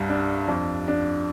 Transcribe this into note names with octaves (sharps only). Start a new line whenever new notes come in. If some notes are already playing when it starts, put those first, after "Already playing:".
Already playing: C2 G2
D4
F2
D4